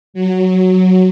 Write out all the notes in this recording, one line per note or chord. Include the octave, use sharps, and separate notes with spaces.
F#3